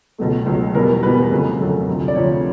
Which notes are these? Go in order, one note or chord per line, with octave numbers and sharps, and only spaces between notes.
C#2 B2 F#3 A3
C#2 B2 F#3 A3
E2 B2 G3 B3 A#4
E2 B2 G3 B3 B4
F2 C#3 F#3 A3
F2 C#3 F#3 A3
D2 C3 F3
D5
D2 C3 F3 C#5